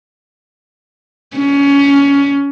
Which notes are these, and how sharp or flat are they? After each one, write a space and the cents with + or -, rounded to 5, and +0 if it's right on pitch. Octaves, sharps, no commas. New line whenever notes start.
C#4 +20